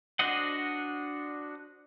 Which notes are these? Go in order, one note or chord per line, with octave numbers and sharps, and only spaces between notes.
D4 F#4 C5 D#5 F#5